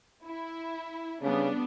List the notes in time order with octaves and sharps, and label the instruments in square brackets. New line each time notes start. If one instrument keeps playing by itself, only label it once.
[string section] E4
[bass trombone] C#3 [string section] G3 B3 D4